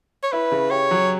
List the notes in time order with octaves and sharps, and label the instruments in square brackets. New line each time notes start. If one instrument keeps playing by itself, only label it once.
[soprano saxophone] C#5
[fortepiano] E4 [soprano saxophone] B4
[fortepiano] C#3
[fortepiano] G4 [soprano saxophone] C#5
[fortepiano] F#3